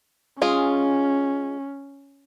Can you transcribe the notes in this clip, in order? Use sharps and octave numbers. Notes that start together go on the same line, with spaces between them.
G#3 C#4 F4 G#4